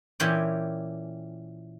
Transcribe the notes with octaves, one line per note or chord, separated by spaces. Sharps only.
A#2 E3 C#4 G4 C#5 G5